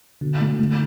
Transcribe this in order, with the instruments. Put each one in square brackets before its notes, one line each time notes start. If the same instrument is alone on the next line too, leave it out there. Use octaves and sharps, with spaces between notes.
[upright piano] B2 [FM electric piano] D3
[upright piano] A3
[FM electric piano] D3 [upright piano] A3